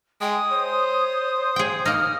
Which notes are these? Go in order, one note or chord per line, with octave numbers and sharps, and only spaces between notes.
G#3 G5 D#6
C5 C#5
G#4 G5
A#3 D#4 F6